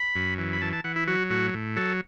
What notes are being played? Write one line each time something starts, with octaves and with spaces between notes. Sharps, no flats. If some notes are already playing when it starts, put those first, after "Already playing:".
Already playing: B5
F#2
E3
B5
E3 A5
A5
E3 F#5
E4
F#3 F#4
A2 F#4
A2
F#3 A4